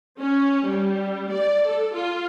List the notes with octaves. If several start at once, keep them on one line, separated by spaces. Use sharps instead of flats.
C#4
G3
D5
A4
F4